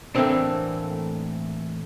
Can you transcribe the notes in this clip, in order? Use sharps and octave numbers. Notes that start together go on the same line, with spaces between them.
A2 E3 A3 A#3 C4 D4